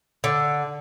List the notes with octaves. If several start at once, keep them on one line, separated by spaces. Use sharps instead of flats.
D3